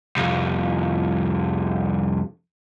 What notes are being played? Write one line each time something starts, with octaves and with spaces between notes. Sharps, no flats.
C2 F2